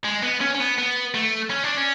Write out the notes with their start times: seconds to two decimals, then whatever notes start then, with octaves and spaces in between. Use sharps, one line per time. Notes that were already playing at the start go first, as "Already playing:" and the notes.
0.04 G#3
0.22 B3
0.41 C#4
0.54 C#4
0.60 B3
0.78 B3
1.14 A3
1.50 C#4
1.64 D4
1.77 C#4